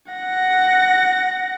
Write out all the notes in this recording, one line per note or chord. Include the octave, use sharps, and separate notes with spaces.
F#5 A#6